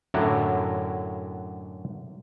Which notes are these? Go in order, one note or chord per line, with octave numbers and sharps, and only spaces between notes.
F#2 A2 D3 F#3 D4 E4